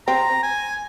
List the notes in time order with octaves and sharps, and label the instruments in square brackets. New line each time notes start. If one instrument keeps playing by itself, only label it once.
[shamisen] C4 [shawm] A#5
[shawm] G#5